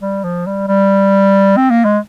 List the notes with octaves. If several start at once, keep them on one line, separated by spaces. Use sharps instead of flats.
G3
F3
G3
G3
C4
A#3
G#3